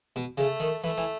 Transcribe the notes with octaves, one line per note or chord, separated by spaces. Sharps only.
B2
C#3 A3
D#3
E3 A3
E3